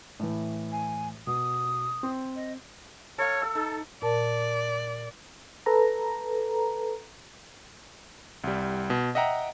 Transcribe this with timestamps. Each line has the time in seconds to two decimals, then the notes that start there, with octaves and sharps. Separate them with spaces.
0.20 A2 E3
0.72 G#5
1.27 B2 D#6
2.03 C4
2.36 D#5
3.18 A4 C#5 F5
3.42 A4 E6
3.55 D#4 A4
4.02 A#2 A#4 D5 A5
5.66 A4 B4 A#5
8.44 C2 G3
8.90 B2
9.15 D#5 E5 F#5 G5 A#5